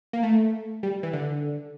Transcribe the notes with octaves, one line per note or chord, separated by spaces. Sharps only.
A#3
A3
G3
E3
D3